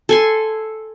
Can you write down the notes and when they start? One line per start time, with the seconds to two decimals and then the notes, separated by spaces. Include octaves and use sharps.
0.09 A4 G#5 C6